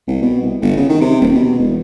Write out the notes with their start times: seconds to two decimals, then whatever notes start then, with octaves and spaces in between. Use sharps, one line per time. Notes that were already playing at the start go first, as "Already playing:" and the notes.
0.07 C2
0.22 B2
0.42 C2
0.61 G1
0.77 C#3
0.90 D#3
1.01 C3
1.21 D#1
1.35 B2
1.59 E1